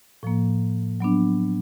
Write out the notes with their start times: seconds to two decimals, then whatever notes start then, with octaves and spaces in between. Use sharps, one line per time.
0.23 A2 F3 A#3
1.00 F#3 B3 D4